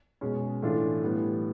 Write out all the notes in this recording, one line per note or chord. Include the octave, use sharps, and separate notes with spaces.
B2 G#3 C#4
A2 E3 A3 D4 F4
A2 E3 G3 B3